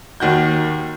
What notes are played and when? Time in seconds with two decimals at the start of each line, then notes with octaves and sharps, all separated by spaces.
0.20 D#2 D#3 F#4 G6